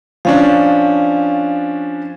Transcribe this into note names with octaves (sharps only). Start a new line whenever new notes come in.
F3 C#4 D4 F5